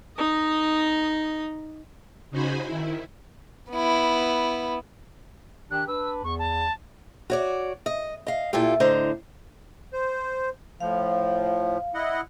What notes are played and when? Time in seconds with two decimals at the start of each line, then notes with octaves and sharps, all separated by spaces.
0.17 D#4 D#5
2.31 C#3 D#4 F#4 C5 G#5 B5
2.65 D#3 E4
3.71 B3 E4
5.71 D#3 D4 G4 F#6
5.88 D4 B4 E6
6.24 E2 C#6
6.39 A5
7.30 F#4 C#5 D5
7.86 D#5
8.27 D#5 F5
8.53 A#2 E4 F4 G4 A4
8.80 A2 D3 C5 D#5 A#5
9.93 C5
10.80 A2 F3 F5
11.94 E4 D#5 F#5